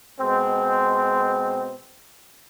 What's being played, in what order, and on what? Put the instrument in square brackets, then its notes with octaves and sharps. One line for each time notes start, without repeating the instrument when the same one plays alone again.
[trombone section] B2 G#3 C4